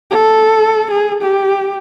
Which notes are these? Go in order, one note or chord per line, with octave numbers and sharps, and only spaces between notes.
A4
G#4
G4